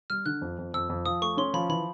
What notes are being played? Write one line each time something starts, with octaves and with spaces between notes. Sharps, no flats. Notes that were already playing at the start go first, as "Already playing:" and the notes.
G3 F6
D3 F#6
F2
F2
F2 E6
F2
F3 D#6
A3 C#6
C#4 C6
F3 B5
E3 B5